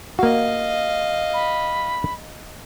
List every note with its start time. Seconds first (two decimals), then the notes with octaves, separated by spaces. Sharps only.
0.19 A#3 F#4 D#5 F5
1.34 B5